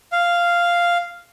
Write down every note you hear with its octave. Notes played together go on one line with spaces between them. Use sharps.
F5